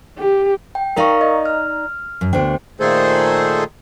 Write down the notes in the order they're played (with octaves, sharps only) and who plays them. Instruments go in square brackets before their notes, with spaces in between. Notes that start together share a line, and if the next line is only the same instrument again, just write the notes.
[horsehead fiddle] G4
[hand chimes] G5
[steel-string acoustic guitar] D#4 D5 A#5 [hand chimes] A#4 F5 C#6
[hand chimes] D#5
F6
[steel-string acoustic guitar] F#2
[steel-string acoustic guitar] D2 D4 [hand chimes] B3 C5 G5
[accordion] A#2 D#3 A3 G#4 A4 C5